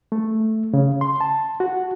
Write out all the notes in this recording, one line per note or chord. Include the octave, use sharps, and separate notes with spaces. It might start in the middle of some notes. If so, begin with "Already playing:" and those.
A3
C#3
C6
A5
F#4